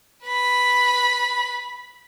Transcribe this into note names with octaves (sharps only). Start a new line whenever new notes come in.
B4 B5